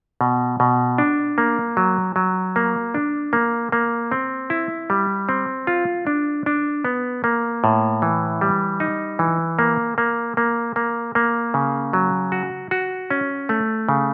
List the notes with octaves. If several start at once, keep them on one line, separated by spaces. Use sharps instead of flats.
B2
B2
D4
A#3
F#3
F#3
A#3
D4
A#3
A#3
C4
E4
G3
C4
F4
D4
D4
B3
A#3
A2
E3
G3
D#4
E3
A#3
A#3
A#3
A#3
A#3
C#3
F#3
F#4
F#4
C#4
A3
C#3